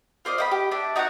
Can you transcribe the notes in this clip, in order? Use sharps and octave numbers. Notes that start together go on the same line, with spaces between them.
F4 C5 D5 D#5
D#5 F#5 B5
G4
D4 E5
D#4 F#4 C#5 F#5